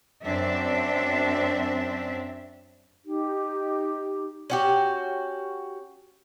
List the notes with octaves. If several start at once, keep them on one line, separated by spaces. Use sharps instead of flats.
F#2 C4 D4 E5
D#4 G4
C#4 F#4 G4